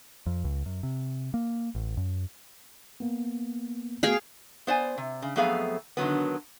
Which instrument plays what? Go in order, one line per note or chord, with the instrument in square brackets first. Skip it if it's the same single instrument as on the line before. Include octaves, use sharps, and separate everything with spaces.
[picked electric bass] F2
C#2
F#2
C3
A#3
A1
F#2
[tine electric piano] A#3 B3
[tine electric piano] A3 B3 F#4 [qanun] G#4 F5 G5
[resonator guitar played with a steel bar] B3 C5 D5 G#5
C3
C#3
F2 F#3 A3 B3 G#4 F5
D3 D#3 F#3 B3